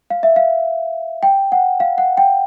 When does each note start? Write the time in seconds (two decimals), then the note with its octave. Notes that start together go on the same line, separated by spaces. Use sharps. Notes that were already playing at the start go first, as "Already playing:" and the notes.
0.10 F5
0.23 E5
0.36 F5
1.23 G5
1.52 F#5
1.80 F5
1.98 F#5
2.17 G5